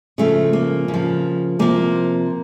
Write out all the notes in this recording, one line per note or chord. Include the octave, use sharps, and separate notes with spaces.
C#3 F3 A3
A#3
C#3
F3
C3 F3 A#3